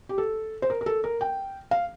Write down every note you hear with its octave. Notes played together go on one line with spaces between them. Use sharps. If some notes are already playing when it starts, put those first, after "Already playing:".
G4
A4
C5
A#4
A#4
A4
A#4
G5
F5